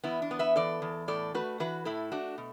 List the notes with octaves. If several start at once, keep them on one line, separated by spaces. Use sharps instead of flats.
E2 B3 E4
D4
B3
B4 E5
E3 A4 D5
E2
A2 A4 D5
A3 F#4 B4
E3 F#4 B4
A2 E4 A4
A3 D4 F#4
B2